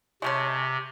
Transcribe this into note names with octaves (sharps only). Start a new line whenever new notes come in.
C3 G#3 A3 C#4